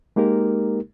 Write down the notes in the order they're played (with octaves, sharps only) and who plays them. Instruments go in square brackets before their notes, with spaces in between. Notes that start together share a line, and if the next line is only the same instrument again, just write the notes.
[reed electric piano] G#3 A#3 D#4 G4 A#4